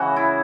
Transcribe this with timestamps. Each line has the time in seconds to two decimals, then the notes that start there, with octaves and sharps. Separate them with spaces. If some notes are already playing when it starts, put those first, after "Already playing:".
Already playing: C#3 E3 F#4
0.16 E4